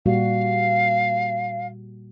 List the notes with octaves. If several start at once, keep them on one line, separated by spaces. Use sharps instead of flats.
A#2 G3 F#4 F5